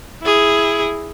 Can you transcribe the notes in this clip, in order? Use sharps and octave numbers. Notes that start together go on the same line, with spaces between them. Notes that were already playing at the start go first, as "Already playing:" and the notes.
E4 G#4